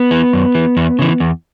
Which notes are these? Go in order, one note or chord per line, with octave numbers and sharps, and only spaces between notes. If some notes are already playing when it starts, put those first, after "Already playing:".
Already playing: B3
E3
F#2
E3
E2
C#3 E3
E2